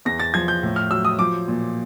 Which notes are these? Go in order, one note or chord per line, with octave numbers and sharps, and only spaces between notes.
E2 A#6
A6
F3 G#6
G6
A2
F6
F#3 E6
D#6
F3 D6
A#2